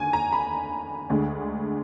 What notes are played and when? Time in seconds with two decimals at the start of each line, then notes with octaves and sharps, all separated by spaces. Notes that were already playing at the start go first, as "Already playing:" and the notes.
Already playing: D#2 D3 G#5
0.13 A#5
0.32 B5
1.10 D2 D3 G#3